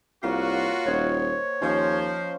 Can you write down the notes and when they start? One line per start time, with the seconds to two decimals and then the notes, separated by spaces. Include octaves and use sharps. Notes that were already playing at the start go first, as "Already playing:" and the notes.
0.24 C2 A#3 F4 F#4 C#5
0.86 D#1 C5 C#5 D#5 F#5
1.62 D#2 F3 C#4 F4 C5 D#5